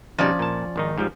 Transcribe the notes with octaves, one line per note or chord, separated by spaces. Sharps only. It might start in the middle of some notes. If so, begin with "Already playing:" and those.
B2 F3 G3 C#4 D#4 D5
A#2 A5
G#1 D#3 D#4
G#2 F3 G3